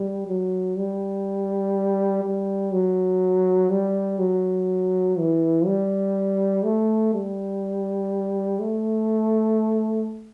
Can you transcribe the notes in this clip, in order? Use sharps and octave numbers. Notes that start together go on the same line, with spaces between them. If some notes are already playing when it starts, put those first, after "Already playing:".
Already playing: G3
F#3
G3
G3
F#3
G3
F#3
E3
G3
A3
G3
A3